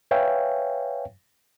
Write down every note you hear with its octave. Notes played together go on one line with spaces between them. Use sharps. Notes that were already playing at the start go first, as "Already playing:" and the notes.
B4 C#5 E5 F5 G5 G#5